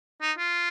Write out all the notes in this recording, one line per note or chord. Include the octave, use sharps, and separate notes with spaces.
D#4
F4